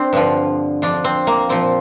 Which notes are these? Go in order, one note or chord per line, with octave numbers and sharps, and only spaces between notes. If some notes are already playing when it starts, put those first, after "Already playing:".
Already playing: C4 D4
G2 D3 F3
F2 F3 D4
C4
A#3
A#2 F3 C4